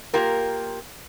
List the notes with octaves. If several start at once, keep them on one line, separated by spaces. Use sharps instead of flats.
A#3 F4 G4 A#4